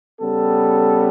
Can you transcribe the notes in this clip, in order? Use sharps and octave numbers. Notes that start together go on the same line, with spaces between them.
C#3 G3 B3 A4